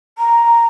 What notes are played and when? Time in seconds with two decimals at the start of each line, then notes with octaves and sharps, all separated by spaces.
0.18 A#5